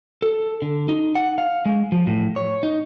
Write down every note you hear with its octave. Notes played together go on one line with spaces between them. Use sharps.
A4
D3
D#4
F#5
F5
G#3
F3
A2
C#5
D#4